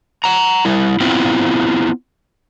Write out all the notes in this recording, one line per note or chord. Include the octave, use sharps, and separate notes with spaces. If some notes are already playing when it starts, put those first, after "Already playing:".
F#5 A#5
G3 E4
B3 C4 E4 F4 G5